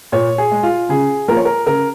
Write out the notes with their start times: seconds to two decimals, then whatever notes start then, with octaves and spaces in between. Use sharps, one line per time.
0.12 A#2 C#5
0.38 G#4
0.51 G#3
0.63 F4
0.89 C#3 G#4
1.28 F3 A#3 A#4
1.37 C#5
1.45 A#4
1.66 C#3 A#4